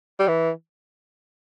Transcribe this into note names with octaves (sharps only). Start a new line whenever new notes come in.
G3
E3